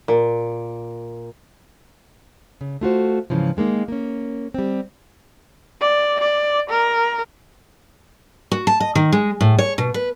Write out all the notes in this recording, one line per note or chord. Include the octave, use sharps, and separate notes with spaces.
A#2
C#3
A3 F4 F#4 C5
G#2 C#3 E3 F3
D#3 G#3 A#3 D#4
A#3 C#4
G3 C4
D5
D5
A#4
F#4
A5
D#5
D#3
G#3
A2
C#5
B2
B4